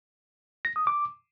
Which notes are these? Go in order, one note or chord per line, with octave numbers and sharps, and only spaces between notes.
A#6
D#6
D6